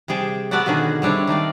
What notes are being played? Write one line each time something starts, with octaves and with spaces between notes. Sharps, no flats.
C3 G3 G#4 G5 A5
B3 F#4 A4 B4 D5 F#5
B2 D3 D#3 A#3 C#4 G#4
G3 C4 D4 E4 C#5
D#3 A3 D5 F5